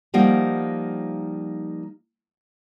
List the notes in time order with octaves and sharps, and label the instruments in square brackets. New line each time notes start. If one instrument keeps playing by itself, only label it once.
[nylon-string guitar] F3 G3 A#3 D#4 F#5